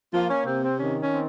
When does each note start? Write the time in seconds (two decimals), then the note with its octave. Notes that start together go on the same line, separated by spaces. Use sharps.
0.12 F3 A#3 F4
0.30 C#4
0.46 C3 C4
0.62 C4
0.79 D#3 C#4
1.00 C#4
1.11 C4